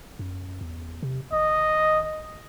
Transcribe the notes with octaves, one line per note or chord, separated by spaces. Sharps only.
F#2
E2
C3
G#1 D#5